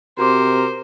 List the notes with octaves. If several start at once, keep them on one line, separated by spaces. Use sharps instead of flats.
C3 F#4 A#4 C5 C6 D6